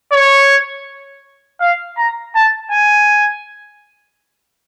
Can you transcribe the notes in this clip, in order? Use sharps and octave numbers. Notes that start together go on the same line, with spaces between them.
C#5
F5
A#5
A5
G#5